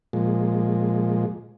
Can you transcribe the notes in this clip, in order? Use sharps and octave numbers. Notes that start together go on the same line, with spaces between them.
A#2 F3 G#3